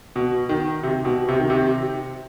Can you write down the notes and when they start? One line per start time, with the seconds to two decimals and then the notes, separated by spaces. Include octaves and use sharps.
0.16 B2
0.49 D#3
0.83 C3
1.05 B2
1.28 C3
1.40 D#3
1.50 C3